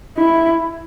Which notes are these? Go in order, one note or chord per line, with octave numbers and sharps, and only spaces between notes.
E4